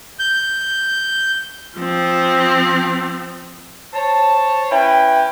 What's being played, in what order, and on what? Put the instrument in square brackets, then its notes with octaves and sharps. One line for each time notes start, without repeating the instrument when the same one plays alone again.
[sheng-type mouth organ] G6
[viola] F3 C4
[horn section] C5 C#5 A5
C#4 E4 B4 G5